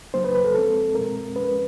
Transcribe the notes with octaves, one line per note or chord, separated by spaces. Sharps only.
C#3 F#3 A#3 D4 C5
B4
B4
A4
F3 G#3 C4 A4
B2 G#3 C4 A#4
F3 G#3 C#4 B4